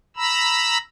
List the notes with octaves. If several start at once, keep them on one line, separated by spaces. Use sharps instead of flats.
A#5 B5 E6